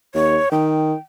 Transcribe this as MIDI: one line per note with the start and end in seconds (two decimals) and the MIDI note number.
0.15 0.38 39
0.15 0.49 73
0.52 0.93 51
0.52 0.98 79